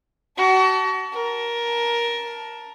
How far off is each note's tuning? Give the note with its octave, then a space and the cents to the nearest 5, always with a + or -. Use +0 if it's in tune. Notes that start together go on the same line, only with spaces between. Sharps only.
F#4 +35 A5 +0
A#4 +15 A5 +0